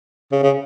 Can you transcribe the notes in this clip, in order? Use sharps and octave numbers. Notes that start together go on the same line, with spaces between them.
C#3
C#3